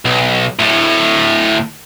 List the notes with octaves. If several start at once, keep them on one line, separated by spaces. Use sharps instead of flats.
B1
D2 A2